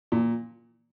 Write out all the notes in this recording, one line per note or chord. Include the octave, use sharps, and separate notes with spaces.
A#2